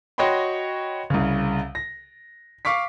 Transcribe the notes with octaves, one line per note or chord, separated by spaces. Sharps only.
F#4 C#5 D#5 G5 B5 C6
C2 C#3
A#6
F5 C#6 D6 B6